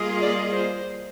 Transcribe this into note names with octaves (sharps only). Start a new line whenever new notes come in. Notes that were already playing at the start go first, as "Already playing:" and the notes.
Already playing: G3 A#3 F4 G#4 D#5
D5
C5